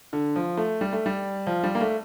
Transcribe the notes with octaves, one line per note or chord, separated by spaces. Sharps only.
D3
F3
A3
G3
A3
G3
F3
G3
A#3
A3